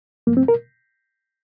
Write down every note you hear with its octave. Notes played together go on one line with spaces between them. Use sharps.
G2 F3 A3 A#3
C4
A#4